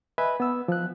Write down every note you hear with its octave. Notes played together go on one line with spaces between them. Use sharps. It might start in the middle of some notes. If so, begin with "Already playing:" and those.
B4 D#5 E5 G#5 B5
B3 E6
F3 F#6